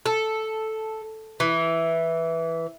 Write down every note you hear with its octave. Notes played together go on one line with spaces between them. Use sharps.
A4
E3